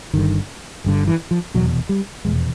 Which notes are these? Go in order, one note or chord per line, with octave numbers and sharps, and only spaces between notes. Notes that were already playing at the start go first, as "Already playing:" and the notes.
G1 G2 D3 D#3
G1 G2 D3
E3
F3
F1 E2 B2 F#3
G3
F1 E2 B2 G#3